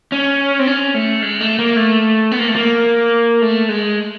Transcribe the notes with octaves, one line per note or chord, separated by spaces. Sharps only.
C#4
C4
C#4
A3
G#3
A3
A#3
A3
B3
A#3
A3
A#3
A3
G#3